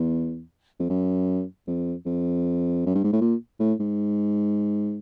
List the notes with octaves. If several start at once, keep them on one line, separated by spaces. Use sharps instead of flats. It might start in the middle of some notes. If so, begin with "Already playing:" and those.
Already playing: E2
F2
F#2
F2
F2
F#2
G2
G#2
A2
A#2
A2
G#2